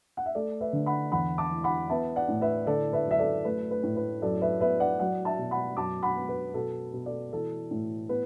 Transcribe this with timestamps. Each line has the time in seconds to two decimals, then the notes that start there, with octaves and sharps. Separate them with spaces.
0.17 F#5
0.26 E5
0.35 A3 A4 D5
0.61 B4 E5
0.73 D3
0.86 F#5 B5
1.12 E2 F#5 B5
1.38 A5 D6
1.51 E3
1.64 F#5 B5
1.90 B3 E5 A5
2.16 D5 F#5
2.29 A2
2.41 B4 E5
2.67 D3 A4 D5
2.93 B4 E5
3.06 F#2 E5
3.19 A4 D5
3.45 A3 B4
3.71 B4
3.83 A2
3.96 B4
4.22 F#2 A4 D5
4.42 B4 E5
4.60 B3 B4 E5
4.80 D5 F#5
5.00 F#3 D5 F#5
5.25 E5 A5
5.38 B2
5.51 F#5 B5
5.77 F#2 A5 D6
6.03 F#5 B5
6.16 B3
6.29 B4
6.54 B2 A4
6.93 B2
7.06 A4 D5
7.33 E3 A4
7.71 A2
8.09 B3 B4